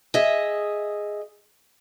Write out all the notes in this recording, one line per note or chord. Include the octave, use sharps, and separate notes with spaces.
G#4 D#5 E5